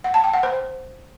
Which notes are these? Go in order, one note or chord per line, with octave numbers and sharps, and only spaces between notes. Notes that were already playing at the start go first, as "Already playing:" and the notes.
F#5
A5
G5
F#5
C5